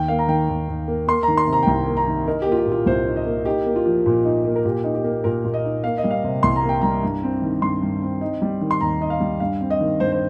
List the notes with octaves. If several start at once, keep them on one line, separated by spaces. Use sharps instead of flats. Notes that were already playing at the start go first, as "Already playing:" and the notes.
Already playing: D#2 G5
A#3 F5
A#5
D#3 G5
D#2
D#2
A#3
A#3 C6
A#5
D#3
C6
C3
A#5
G5
C2 A#5
A#3
A#5
D#3
D#4 A#4
A#3 G4
F4
G4
A#2
F4
C2 C5
D#4
D#5
A#3
D#4 G4
A#3
F4
F3
A#2
D#4
A#3
A#4
A#2 G4
D#4
G4
A#3
A#2 A#4
A#2
D#5
D#4
A#3 F5
D#5
G3
F5
C3
C2 C6
A#5
A#3
G5
G3 A#5
G2
C4
D#3
G2 C6
G2
C4
D#4
G3
D#3
C6
D#2 A#5
D#4 D#5
F5
G3
G2 F5
C4
D#5
D#3
G2 C5
C5